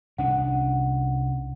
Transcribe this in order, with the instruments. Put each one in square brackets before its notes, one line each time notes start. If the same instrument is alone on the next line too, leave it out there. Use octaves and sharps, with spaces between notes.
[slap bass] C2 C#4 D4 [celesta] F#5